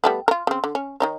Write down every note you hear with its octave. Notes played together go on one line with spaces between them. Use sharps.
G3 A3 B3
F4 A#4
C#3 C4
D3
C#4
D#3 D#4 C#5